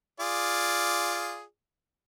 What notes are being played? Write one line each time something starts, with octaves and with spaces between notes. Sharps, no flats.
F4 G#4 D5